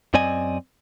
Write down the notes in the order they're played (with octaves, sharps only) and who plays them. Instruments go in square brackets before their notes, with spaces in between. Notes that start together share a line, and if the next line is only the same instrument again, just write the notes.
[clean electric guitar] F#2 C4 D5 D#5 G#5